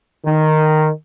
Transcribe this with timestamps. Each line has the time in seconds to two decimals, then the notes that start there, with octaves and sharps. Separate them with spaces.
0.25 D#3